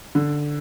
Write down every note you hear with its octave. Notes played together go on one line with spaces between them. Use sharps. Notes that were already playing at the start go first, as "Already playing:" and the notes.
D3